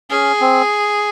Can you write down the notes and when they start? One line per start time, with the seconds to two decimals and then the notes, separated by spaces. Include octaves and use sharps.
0.10 C#4 G#4
0.41 C4